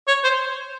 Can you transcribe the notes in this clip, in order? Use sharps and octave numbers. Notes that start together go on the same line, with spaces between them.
C#5
C5